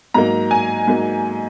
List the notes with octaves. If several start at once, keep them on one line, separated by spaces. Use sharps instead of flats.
G#2 F#3 A#3 A#5
G#5
G#2 F#3 A#3